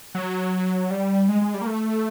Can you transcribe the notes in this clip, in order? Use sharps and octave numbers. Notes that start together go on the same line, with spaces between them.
F#3
G3
G#3
G#3
G3
A#3
A3